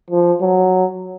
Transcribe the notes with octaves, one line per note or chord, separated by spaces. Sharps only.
F3
F#3